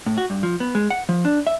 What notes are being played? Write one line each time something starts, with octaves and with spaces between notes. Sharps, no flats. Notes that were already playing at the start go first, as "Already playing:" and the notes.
A2
F#4
G2
F3
B3
G#3
F#5
F3
D4
E5